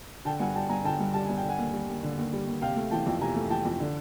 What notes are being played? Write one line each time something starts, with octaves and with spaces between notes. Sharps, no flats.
D3 G5 A5
G2 F#5 G#5
G3 G5 A5
G2 G#5 A#5
D3 G5 A5
G2
G3 A5
G2 G#5
G5
D3
F#5 G#5
D#2
G3
D#2
D3
D#2
G3
D#2
C3 F5 G5
A3
E3 G5 A5
F2
C3 G#5 A#5
A3
E3 G5 A5
F2
D3